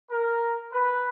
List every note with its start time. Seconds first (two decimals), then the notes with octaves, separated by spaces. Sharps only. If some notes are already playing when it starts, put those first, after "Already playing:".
0.09 A#4
0.72 B4